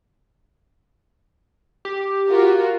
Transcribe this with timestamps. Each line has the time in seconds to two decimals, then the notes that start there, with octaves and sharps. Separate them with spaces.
1.85 G4
2.29 F4 F#4 A#4